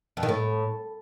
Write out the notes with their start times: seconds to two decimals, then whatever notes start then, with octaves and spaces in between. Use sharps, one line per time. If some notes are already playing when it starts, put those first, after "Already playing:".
0.17 F2
0.23 D#3
0.29 A2